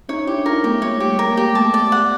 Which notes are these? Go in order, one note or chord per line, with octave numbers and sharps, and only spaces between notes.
C#4 D#4 C#5
D#4
D4 E4 G4
D#4 F4 A#4
A3 B3 G4
G#3 A#3 C#5
G4
G3 A3
A#4
G#3 A#3
G4
A3 B3 A5
D5
F#5